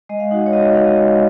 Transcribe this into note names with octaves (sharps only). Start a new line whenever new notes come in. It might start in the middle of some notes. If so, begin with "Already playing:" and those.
G#3 D#5
F5
D#4 F#4 F#5
C#5
G#3 D#5
D#5
D#4 F#4 F5
D#5
G#3